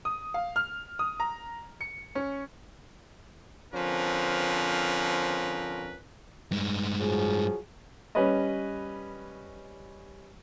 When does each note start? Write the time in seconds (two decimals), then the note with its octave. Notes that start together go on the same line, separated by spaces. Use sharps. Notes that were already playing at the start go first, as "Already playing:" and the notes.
0.05 D#6
0.34 F5
0.56 F6
0.99 D#6
1.20 A#5
1.81 C#7
2.15 C#4
3.74 D3 F3 C4 C#4 A#4 B4
6.51 G2 G#3
6.99 F3 F#3 G#4
8.15 G3 C#4 B4 C#5 D#5